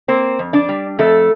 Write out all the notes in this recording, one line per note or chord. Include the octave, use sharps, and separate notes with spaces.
A#3 C4 C5
F2
D4 D5
G3
F2 A3 A4